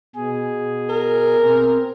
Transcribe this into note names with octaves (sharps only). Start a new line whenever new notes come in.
B2 G#4
A#4
C4